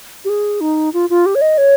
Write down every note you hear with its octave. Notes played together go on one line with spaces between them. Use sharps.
G4
G#4
D#4
F4
F4
G4
C#5
D#5
C#5